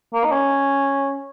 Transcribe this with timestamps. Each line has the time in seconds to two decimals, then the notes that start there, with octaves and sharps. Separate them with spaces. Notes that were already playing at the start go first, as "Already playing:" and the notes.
0.14 A#3
0.24 D#4
0.32 C#4